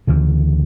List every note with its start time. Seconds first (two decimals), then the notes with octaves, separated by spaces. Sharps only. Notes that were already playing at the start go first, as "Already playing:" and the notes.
0.07 D2 C#3 E3